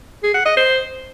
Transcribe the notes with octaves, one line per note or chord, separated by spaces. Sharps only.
G#4
F#5
D#5
C5